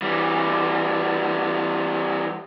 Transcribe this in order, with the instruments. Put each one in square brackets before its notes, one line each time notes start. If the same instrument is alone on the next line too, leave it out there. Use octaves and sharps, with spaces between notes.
[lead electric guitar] E3 G3